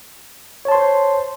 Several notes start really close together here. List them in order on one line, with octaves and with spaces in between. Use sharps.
C#5 A5 C6 C5